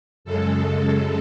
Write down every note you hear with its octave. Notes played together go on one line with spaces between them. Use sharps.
F#2 C#3 G#3 A4